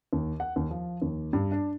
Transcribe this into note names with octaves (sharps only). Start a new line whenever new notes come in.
D#2
F#5
D#2
F3
D#2
G2
D4